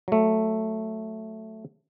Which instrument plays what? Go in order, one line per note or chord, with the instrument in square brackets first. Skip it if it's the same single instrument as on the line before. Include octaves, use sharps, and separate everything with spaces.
[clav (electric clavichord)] F#3 A3